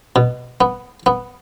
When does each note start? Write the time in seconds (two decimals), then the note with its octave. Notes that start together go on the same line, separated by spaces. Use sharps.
0.16 B2
0.61 B3
1.06 B3